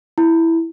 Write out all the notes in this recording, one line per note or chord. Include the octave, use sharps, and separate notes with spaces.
E4